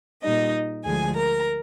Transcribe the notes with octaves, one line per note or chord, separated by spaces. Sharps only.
A#2 G3 D#4 D#5
D2 D3 F3 G#3 G#4 G#5
A#4 A#5